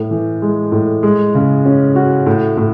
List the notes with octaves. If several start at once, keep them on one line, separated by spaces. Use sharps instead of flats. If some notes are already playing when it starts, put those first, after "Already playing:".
Already playing: A2
E3
G#3
A2
G#3
C#3
C#4
F#4
A2
A2